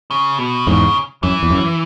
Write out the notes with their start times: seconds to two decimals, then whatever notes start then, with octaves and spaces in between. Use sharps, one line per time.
0.11 C#3
0.39 B2
0.67 E2 G#2 C#3
1.23 F#2 E3
1.43 E2
1.50 F#2